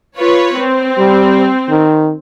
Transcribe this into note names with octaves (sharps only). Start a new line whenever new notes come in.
F4 B4 C#5
C4
G3
D#3